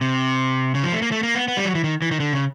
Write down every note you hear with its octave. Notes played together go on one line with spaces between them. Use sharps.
C3
C#3
F3
A3
A#3
A3
A#3
B3
B3
G3
F#3
E3
D#3
E3
D#3
D3
C#3